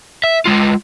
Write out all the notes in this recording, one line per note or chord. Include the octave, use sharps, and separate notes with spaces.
E5
G#3 F4